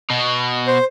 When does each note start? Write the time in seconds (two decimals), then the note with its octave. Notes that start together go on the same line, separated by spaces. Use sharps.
0.10 B2
0.68 C5